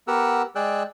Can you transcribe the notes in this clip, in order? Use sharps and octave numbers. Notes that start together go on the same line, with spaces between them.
B3 G4 A#4 F#5 E6
G#3 G#4 D5 G5 E6 F#6